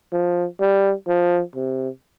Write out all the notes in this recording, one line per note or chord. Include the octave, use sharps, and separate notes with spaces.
F3
G3
F3
C3